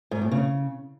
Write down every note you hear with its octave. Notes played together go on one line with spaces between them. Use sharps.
G#2
A2
C#3